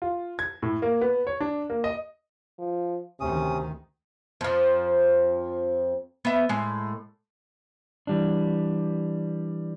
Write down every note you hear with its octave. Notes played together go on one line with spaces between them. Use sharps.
F4
G#6
A2
A#3
B3
C#5
D4
A#3
D#5
F3
D2 C3 D#3 C#4 D#6
F2 F3
B3 E5
A2 G#3
E3 G3 D4